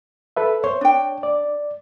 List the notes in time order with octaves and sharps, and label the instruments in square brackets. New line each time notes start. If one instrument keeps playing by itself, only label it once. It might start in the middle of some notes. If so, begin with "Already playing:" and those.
[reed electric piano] A4 B4 E5
[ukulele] C5 [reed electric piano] C#5
[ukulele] D4 G5
[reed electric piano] D5